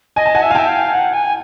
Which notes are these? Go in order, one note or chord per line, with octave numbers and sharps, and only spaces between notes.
D#5 G#5
A5
F#5 G#5
E5
F5 G#5
E5 G5 A5
F5
F#5
G#5